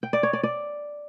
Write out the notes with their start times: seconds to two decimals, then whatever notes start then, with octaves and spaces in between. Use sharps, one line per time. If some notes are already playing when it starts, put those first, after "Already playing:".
0.03 G5
0.13 D5
0.23 C#5
0.33 D5
0.43 D5